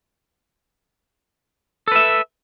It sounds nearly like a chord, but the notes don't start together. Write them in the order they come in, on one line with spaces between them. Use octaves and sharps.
A4 B4 E5